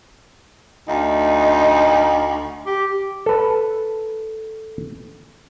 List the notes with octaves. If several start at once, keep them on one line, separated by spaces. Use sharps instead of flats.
D2 D#4
G4
A4 B4